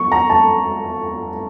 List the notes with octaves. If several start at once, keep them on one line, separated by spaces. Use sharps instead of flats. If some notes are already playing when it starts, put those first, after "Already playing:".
Already playing: C#6
A#5
A5